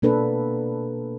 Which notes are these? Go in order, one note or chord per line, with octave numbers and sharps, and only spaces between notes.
B2 A#3 D4 A4 B4